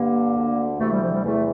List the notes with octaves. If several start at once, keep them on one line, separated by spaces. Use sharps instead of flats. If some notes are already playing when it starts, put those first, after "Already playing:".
Already playing: G2 D3 A#3
D2 D3
D2 C3 E3 A3
G3
F3
G3
E2 C3 E3 A3